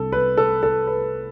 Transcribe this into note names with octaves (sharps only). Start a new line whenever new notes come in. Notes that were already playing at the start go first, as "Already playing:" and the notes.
Already playing: C2 C3 G3 D4 A4
B4
A4
A4
B4